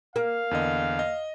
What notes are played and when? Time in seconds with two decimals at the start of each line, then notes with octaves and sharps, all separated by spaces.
0.16 A#3 F5
0.51 E2 D3 D#5
0.99 D#5